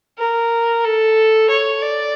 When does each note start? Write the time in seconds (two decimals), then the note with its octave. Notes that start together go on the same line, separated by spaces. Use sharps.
0.18 A#4
0.85 A4
1.50 C#5
1.82 D5